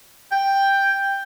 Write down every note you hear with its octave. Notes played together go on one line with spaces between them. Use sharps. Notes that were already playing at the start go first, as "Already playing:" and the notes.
G5